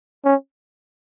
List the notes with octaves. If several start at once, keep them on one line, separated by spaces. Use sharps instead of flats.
C#4